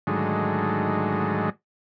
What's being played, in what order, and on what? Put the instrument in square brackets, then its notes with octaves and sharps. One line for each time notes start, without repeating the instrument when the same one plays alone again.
[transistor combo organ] G#2 D3 D#3 F#3 G#3 A3